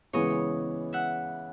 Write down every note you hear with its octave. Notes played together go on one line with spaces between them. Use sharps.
C#3 E3 G#3 B3 C#5 D#5
E5 F#5